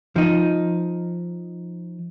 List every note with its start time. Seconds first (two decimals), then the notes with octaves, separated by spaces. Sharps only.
0.16 F3 D#4